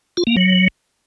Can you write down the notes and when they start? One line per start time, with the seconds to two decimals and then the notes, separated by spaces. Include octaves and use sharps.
0.17 F4
0.27 A#3
0.37 F#3